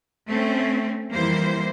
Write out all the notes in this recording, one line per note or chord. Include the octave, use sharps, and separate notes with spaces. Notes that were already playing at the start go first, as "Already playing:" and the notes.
A3 C4 C#4
F2 E3 G3 A#3 E4 C5